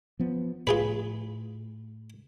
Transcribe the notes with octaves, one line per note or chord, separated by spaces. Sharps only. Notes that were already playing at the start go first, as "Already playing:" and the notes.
F3 B3
A2 F4 G#4 B4